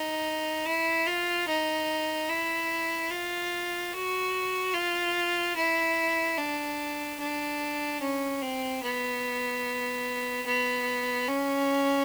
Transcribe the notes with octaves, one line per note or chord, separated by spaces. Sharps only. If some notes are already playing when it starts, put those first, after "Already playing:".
Already playing: D#4
E4
F4
D#4
E4
F4
F#4
F4
E4
D4
D4
C#4
C4
B3
B3
C#4